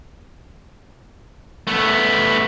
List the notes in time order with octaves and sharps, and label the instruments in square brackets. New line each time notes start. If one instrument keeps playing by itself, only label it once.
[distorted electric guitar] A3 B3